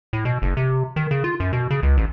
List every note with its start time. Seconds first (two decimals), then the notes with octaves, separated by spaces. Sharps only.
0.13 A2
0.25 B2
0.42 F#1
0.57 C3
0.96 D#3
1.11 C#3
1.24 F4
1.40 F#2
1.53 B2
1.71 C#3
1.83 C#2
1.97 A1